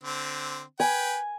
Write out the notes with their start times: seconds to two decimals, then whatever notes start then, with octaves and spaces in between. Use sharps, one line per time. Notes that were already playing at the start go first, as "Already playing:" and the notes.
0.04 D3 C4
0.80 B4 G5 G#5